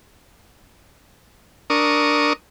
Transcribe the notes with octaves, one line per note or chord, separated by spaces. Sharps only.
D4 A#4 C#6 D#6